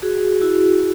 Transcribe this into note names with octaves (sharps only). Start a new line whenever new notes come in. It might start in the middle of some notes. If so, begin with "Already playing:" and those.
F#4 G#4
E4 F#4